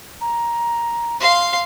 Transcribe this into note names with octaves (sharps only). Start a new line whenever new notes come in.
A#5
F5 C6